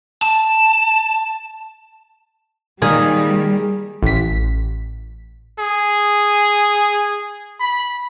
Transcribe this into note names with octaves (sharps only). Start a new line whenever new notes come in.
A5
A#2 D#3 G3 G#4
A1 B6
G#4
B5